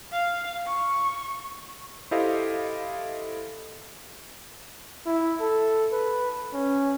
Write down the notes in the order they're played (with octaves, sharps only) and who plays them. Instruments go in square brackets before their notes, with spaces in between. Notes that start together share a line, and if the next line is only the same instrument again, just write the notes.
[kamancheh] F5
C#6
[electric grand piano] E4 G4 A4 C5 D#5 F5
[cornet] E4
A4
B4
C#4